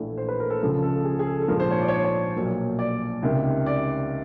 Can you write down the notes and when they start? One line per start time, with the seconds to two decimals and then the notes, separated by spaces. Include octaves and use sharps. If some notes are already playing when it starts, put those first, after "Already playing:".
Already playing: A#1 A2 E3 A3
0.18 C5
0.29 B4
0.40 A#4
0.50 A4
0.61 C#2 C#3 F3 G#3 A4
0.83 A4
1.04 G#4
1.19 G#4
1.27 A4
1.42 A4
1.48 A#1 G#2 F3 A#3 A#4
1.60 C5
1.71 C#5
1.81 D5
1.88 C#5
1.96 C5
2.04 C#5
2.36 B1 A#2 F#3 A#3
2.79 D5
3.22 C#2 C3 D#3
3.66 D5